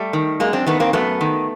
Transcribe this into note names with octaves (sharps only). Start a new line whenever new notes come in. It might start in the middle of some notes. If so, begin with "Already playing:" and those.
Already playing: G3 A3
D#3
F#2 G#3 A#3
C4 D4
D#3 A3 B3
A#3 C4
F#2 A3 B3
D#3